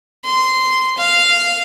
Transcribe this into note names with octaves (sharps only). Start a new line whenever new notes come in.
C6
F5